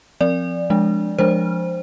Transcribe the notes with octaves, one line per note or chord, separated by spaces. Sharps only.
F3 C4 D5
F3 G#3 D4
F3 G#3 D4 C5